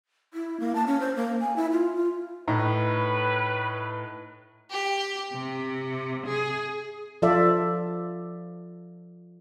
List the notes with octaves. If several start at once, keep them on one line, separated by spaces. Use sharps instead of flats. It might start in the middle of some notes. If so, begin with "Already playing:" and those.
E4
A#3
A5
C#4
C5
A#3
G#5
E4
F4
F4
A2 D#4 B4 A#5
G4
C3
G#4
F3 F4 A4 D5 E5